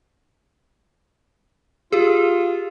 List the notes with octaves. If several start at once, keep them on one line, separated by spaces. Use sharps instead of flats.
F4 G4 G#4